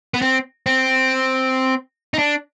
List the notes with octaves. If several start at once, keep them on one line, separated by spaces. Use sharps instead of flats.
B3
C4
C4
D#4
D4